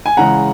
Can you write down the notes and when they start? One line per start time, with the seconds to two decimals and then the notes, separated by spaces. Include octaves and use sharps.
0.06 G#5
0.17 C#3 E3 G#3 F#5 A#5